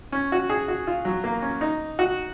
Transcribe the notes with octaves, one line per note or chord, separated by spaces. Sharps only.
C#4
F#4
G#4
F#4
F4
F#3
A#3
C#4
D#4
F#4